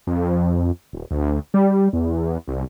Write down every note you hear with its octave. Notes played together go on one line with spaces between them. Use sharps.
F2
D#1
D2
G3
E2
C2